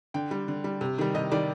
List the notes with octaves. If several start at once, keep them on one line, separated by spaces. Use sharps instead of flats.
D3 G5
G3
D3
G3
C3
D#3 G3
C3 D#5
D#3 G3 D5